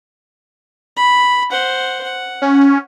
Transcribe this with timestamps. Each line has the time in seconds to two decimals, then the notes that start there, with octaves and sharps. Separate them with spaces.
0.97 B5
1.50 C5 F#5
2.04 F#5
2.42 C#4